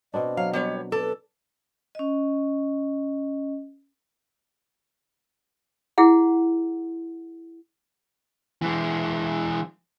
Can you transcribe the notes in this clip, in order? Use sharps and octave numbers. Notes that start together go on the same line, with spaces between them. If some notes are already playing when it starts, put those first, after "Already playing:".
B2 C4 D4 D#5
F#3 F5
G3 B3 C#5
A4 B4 D5
C#4 D#5
E4 G#4 F#5
E3 G#3